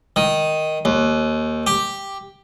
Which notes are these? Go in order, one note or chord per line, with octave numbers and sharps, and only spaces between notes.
D#3
D#2
G4